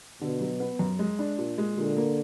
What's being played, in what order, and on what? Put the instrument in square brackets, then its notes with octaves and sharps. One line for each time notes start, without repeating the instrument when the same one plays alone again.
[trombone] B2 [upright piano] D3
[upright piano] F#3
B3
F#2
G#3
D4
A#2
G#3
[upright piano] A#2 [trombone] D3
[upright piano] A#3